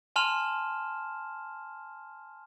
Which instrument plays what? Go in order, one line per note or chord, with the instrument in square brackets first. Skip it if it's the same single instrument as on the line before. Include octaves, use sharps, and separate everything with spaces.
[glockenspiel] G#5 A5 C6 F6 E7 F7